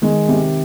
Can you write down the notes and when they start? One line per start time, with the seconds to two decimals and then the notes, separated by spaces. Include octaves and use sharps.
0.02 D#3 G#3
0.28 C3